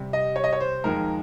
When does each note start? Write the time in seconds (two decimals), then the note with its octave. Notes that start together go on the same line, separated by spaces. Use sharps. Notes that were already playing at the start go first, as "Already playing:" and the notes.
Already playing: C3 G3
0.13 D#5
0.36 C#5
0.44 D#5
0.53 C#5
0.60 C5
0.84 F2 D#3 G#3 A#4